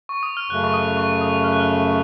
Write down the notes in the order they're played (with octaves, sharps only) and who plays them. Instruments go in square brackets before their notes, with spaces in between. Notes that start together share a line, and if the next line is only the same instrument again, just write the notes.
[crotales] C#6
D#6
F6
[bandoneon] F#2 C#3 A3 [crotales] F#6
[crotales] C#6
D#6
C#6
D#6
F6
F#6
F6
F#6